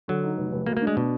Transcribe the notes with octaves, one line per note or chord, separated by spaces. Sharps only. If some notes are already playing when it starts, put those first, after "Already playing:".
D3 F#3
D#4
F1
F1
D2 A#3
A#3
D4
G#3
B2